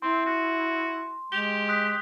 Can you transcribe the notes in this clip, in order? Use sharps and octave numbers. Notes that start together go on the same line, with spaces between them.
C4 E4 C6
F#4
G#3 G4 F7 G7
D#6 F#6 B6